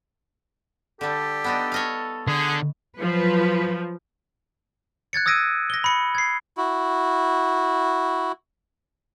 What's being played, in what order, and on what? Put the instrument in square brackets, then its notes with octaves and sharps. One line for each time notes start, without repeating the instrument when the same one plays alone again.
[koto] D3 G3 [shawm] G4 [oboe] A4
[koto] B3 D4 D#4
C#5 D#5 F5
[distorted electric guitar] D3 [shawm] G#4
[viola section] F3 [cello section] F#3 B4
[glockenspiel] F#6 G#6 A6 C#7
D#6 E6 G#6 A#6 D7 D#7
A#6 G7
B5 C#7
G#6 C7
[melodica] E4 F#4